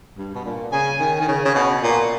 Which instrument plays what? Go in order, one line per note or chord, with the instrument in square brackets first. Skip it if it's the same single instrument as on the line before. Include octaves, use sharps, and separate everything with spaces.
[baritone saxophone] G2
B2
A#2
[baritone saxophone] C#3 [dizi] G#5
[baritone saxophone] D#3
D#3
C#3
C#3
B2
A#2